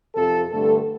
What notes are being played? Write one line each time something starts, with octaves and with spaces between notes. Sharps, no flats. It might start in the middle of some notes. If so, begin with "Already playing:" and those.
F2 C3 F3 A4
G2 D3 A3 A4